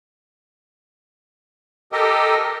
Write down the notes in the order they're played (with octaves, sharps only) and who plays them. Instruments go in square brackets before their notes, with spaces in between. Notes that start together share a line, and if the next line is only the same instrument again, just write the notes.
[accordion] G4 A4 A#4 D#5